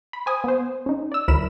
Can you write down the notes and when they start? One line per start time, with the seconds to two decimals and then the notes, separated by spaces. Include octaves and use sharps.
0.13 B5
0.26 C5 G#5 D#6
0.44 B3 C5
0.86 C#4 D#4
1.12 D5 E6
1.28 D2 F#3 E4 A#4 B5 E7